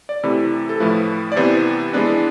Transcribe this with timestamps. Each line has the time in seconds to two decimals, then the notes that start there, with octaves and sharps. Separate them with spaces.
0.09 D5
0.23 C3 E3 A3 E4
0.69 A4
0.80 A2 F3 A3 E4 B4
1.32 D5
1.36 C3 E3 B3 C5
1.93 E3 G#3 B3 D4 B4